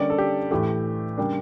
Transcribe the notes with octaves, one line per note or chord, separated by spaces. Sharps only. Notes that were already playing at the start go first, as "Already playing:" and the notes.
Already playing: D3 G3 A#3 C#4 D5
A4
G4
A2 E3 A3 G4
C#3 G3 A#3 D4